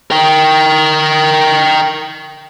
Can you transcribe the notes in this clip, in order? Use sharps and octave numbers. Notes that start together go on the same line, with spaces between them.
A#4 G5